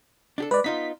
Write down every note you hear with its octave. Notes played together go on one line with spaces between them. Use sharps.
D4 G4 A4
G#3 B4 D5
B3 D#4 F4 B6